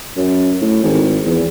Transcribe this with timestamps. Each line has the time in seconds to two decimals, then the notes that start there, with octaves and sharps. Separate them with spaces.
0.17 F#2
0.61 A2
0.83 G#1
1.26 E2